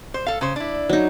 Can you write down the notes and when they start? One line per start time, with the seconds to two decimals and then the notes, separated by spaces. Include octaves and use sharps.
0.14 C5
0.26 A4 F5
0.41 C#3 C5
0.56 D4 E4
0.89 F#3 D#4